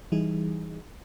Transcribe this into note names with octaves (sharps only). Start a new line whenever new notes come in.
E3 G3 D#4 G#4